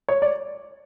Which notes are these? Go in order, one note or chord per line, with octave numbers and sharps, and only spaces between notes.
C#5
D5